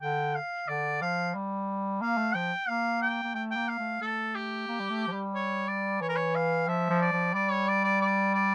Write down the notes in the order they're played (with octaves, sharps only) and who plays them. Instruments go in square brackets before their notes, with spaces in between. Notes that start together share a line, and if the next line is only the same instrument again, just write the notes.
[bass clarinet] D3 [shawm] G5
[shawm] F5
[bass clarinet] D3 [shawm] D5
[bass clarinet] F3 [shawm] F5
[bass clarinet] G3
[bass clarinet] A#3 [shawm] F5
[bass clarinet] A3
[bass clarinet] F3 [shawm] G5
[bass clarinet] A#3 [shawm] F5
[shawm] G5
[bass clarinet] A#3
[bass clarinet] A3 [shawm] G5
[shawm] G5
[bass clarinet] A#3
[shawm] F5
[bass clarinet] A3
[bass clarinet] A3 [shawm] A4
[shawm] G4
[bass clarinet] A#3
G3
A3
F3
G3
[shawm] C#5
D5
[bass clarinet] E3 [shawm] C#5
[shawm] A#4
C#5
F5
[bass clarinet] F3 [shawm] E5
[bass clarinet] F3
[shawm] D5
[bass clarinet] F3
[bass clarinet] G3 [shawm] D5
[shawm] C#5
D5
D5
D5
D5